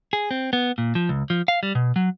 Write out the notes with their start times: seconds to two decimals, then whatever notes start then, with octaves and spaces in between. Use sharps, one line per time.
0.13 G#4
0.31 C4
0.53 B3
0.78 A#2
0.95 F3
1.09 C#2
1.30 F3
1.48 F5
1.63 G3
1.75 B2
1.96 F#3